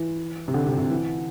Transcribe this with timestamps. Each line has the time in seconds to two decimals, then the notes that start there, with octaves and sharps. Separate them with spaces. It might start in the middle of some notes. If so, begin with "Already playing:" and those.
Already playing: E3
0.48 C3
0.54 D3
0.66 C3
0.78 C3
0.90 E3